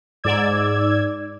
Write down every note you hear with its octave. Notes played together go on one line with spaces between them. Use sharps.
G#2 D5 E6 G#6